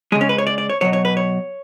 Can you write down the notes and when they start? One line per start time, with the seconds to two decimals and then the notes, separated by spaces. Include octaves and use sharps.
0.12 G#3 G#4
0.15 C#3
0.21 C#4
0.29 B4
0.38 C#5
0.47 D5
0.58 D5
0.70 C#5
0.81 B2 F#3 C#5
0.93 C#5
1.05 B4
1.17 C#5